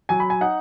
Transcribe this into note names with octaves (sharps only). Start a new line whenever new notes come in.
F#3 G#5
B5
G#5
D#4 F#5